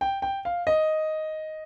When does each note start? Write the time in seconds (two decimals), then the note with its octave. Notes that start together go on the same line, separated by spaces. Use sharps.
0.01 G5
0.22 G5
0.45 F5
0.67 D#5